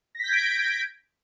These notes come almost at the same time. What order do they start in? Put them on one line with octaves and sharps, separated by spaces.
A#6 B6 G6 G#6 D7